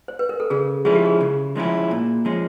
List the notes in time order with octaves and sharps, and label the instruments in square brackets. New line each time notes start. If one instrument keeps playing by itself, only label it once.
[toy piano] C5
B4
A#4
A4
[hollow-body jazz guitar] C#3 [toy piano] G#4
[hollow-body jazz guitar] F3 G#3 C#4 E4 [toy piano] G#4
[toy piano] G4
G#4
[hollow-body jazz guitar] C#3
F3 G#3 C#4 E4
A#2
F3 G#3 C#4